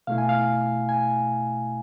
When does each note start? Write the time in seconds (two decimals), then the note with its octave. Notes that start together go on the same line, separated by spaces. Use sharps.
0.07 B2 A3 E4 F5
0.18 G#5
0.29 F5
0.89 G#5